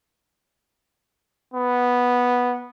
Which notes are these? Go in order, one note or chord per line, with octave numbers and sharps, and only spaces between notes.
B3